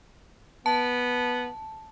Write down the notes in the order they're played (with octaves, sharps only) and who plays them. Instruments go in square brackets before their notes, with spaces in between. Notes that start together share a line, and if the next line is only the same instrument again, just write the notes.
[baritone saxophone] B3 [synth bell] A5